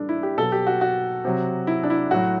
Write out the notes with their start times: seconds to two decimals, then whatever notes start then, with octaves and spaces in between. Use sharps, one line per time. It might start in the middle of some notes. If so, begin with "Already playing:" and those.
Already playing: A2 E3 G3 D4 A4
0.09 E4
0.23 G4
0.38 B2 F#3 A4
0.52 G4
0.67 F#4
0.81 F#4
1.25 C3 F#3
1.67 E4
1.83 D4
1.90 E4
2.11 A2 F#3 F#4